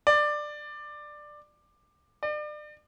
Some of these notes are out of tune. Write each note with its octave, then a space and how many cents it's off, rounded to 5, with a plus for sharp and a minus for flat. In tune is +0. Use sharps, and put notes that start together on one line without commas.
D5 +15
D5 +35